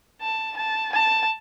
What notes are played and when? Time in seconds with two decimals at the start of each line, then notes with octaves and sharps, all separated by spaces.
0.21 A5
0.57 A5
0.93 A5